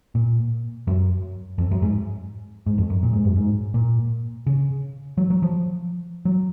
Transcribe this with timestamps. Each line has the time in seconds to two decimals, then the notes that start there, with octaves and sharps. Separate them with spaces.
0.15 A#2
0.87 F#2
1.58 F2
1.71 F#2
1.82 G#2
2.66 G#2
2.78 F2
2.90 F#2
3.03 A#2
3.13 G#2
3.25 F#2
3.36 G#2
3.74 A#2
4.47 C#3
5.18 F#3
5.30 F#3
5.42 F3
6.25 F#3